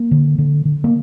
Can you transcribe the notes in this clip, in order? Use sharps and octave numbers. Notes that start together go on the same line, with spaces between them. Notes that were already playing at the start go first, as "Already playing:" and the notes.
Already playing: A#3
D3
D3
D3
A#3